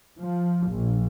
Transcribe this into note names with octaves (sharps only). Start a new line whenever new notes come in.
F3
A#1